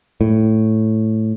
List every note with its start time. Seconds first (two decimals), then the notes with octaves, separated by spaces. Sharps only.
0.21 A2